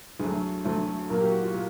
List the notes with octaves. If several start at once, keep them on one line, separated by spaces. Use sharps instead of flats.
D2 D3 F#3 A3 G#4
D2 D3 F#3 A3
A#2 F#3 A#3 A#4
G4
F#4
F4
A#2